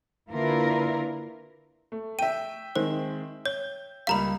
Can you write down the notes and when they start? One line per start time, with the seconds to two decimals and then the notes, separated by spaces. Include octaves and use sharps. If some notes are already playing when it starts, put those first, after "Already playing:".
0.31 D3 A#3 E4 F4 A#4 B4
1.92 A3
2.19 E5 G5 D#7
2.76 D#3 G#3 C4 C5
3.46 C#5 G6 G7
4.07 C#2 G3 A#3 F5 A#5 B5